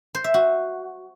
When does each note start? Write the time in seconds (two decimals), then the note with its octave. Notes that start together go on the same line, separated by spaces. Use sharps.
0.15 C5
0.24 E5
0.34 F#4